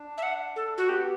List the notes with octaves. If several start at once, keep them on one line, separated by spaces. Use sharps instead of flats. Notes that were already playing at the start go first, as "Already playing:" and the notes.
Already playing: D4
E5
F#5
A4
F#4
B3 G4